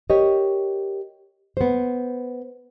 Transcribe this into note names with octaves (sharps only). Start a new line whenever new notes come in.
G4 A#4 C#5 D#5
B3 C5